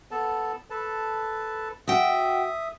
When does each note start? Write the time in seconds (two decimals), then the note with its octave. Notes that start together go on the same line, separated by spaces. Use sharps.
0.11 B3 A4 A5
0.70 A4 B4 A5
1.88 F#4 E5 F#5 G5 D#6